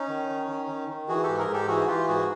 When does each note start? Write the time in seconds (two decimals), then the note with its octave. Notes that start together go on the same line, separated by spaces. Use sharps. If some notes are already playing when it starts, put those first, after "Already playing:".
Already playing: C#4 D#4
0.09 D#3
0.29 D#3
0.49 D#3
0.69 D#3
0.89 D#3
1.08 E3 F#4 G#4
1.23 G4 A4
1.29 G#2
1.38 G#4 A#4
1.48 G#2
1.53 G4 A4
1.68 E3 F#4 G#4
1.88 E3 F4 G4
2.08 G#2 F#4 G#4